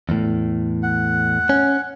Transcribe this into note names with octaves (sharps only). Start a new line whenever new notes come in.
E2 A2
F#5
C#4